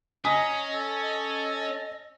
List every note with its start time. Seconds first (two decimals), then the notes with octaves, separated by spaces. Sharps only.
0.25 C#4 D#5 G#5 A#5 D#6 B6
0.73 A4
1.02 D#5